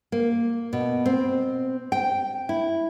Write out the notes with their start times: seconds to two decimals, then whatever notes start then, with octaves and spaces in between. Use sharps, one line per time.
0.12 A#3
0.73 B2
1.06 C4
1.92 G5
2.49 E4